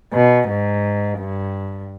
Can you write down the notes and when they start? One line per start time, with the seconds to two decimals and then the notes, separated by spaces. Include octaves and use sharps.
0.13 B2
0.48 G#2
1.19 G2